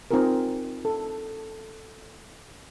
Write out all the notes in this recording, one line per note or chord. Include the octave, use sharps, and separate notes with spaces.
C4 D#4 F4 G#4 A#4
A4